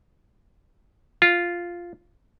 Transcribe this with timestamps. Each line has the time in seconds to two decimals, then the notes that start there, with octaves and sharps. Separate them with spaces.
1.22 F4